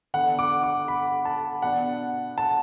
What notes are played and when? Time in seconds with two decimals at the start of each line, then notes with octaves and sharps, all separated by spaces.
0.14 D3 B3 D4 F#5
0.39 D6
0.63 D6
0.88 B5
1.25 A5
1.62 B2 B3 D4 F#5
2.38 A5